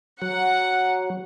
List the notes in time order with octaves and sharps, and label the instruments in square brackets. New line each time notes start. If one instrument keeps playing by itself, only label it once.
[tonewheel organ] F#3 [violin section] F#5